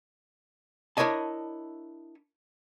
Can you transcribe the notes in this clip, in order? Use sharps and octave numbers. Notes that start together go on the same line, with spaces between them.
D4 E4 A#4 C#5 D#5 A5